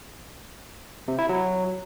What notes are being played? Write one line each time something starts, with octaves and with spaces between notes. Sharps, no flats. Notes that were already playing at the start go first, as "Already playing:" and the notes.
C3
E4
F#3